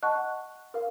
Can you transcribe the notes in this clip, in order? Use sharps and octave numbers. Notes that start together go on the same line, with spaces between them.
D#5 F#5 A5 C#6 F#6
A#4 F5